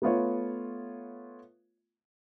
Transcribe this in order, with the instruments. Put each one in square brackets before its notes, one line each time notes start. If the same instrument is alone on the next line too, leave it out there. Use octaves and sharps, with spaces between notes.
[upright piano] A3 B3 F4 C#5